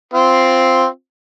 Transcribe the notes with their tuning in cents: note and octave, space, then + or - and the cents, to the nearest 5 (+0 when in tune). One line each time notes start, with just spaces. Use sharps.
C4 +0 F4 +0